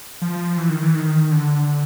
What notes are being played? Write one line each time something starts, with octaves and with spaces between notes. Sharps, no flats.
F3
E3
D#3
E3
D#3
D3